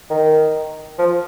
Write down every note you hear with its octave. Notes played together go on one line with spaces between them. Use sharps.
D#3
F3